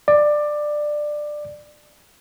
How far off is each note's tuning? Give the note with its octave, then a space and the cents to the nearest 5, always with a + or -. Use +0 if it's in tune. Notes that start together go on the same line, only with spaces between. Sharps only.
D5 +15